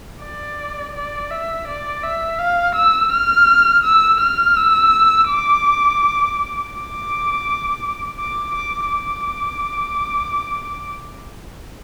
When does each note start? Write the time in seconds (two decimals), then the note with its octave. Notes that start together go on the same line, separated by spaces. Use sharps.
0.22 D5
0.95 D5
1.31 E5
1.68 D5
2.04 E5
2.39 F5
2.76 E6
3.12 F6
3.85 E6
4.21 F6
4.57 E6
5.29 D6
6.75 D6
8.20 D6
8.56 D6
8.92 D6